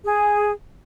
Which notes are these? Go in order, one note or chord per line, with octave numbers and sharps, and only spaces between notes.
G#4